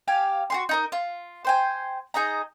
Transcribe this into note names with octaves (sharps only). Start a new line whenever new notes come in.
G4 F5 G#5
F#4 G#4 C6
D#4 A#4 D#5
F4
C5 G5 G#5
D#4 G#4 D#5 A#5